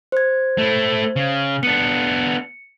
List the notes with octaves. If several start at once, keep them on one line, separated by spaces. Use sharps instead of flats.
C5 G#6
A3 E4
C#3
B3 D4 C#7